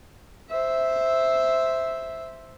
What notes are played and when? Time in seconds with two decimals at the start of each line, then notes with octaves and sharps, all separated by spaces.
0.49 C5 E5